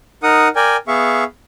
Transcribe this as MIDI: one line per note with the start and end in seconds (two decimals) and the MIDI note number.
0.23 0.48 63
0.23 0.48 70
0.23 0.48 78
0.23 0.48 87
0.56 0.76 70
0.56 0.76 74
0.56 0.76 79
0.56 0.76 80
0.88 1.24 59
0.88 1.24 68
0.88 1.24 76
0.88 1.24 77
0.88 1.24 85